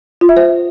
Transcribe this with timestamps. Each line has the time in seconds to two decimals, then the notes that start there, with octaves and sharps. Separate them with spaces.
0.21 F4
0.29 E5
0.37 C5